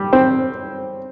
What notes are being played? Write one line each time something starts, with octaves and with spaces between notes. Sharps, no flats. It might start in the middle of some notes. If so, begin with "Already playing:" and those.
Already playing: G3
C4